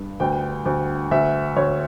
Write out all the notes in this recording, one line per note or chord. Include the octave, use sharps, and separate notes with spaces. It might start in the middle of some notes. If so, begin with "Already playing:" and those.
Already playing: G2
D2 G5
D2
D2 E5
D2 C#5